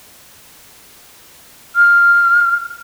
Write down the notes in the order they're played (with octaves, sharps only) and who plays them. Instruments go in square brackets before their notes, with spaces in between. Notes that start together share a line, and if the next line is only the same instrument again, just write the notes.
[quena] F6